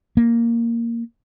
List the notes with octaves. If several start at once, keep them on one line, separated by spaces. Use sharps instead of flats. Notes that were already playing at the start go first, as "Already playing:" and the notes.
A#3